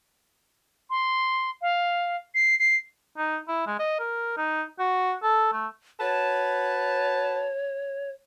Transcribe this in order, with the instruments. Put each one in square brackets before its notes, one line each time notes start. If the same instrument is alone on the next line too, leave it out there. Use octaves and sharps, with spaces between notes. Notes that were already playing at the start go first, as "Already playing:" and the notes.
[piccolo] C6
F5
C7
C7
[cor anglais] D#4
E4
G#3
D#5
A#4
D#4
F#4
A4
A3
[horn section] F#4 B4 A5 [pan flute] C#5